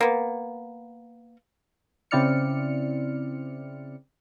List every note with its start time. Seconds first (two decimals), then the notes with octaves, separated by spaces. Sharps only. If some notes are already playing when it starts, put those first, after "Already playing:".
0.01 A#3 B3
2.11 C#3 C4 E4 D5 F6 C#7